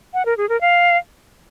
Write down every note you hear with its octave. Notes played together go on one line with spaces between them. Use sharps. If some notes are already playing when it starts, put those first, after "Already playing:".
F#5
A#4
G#4
A#4
F5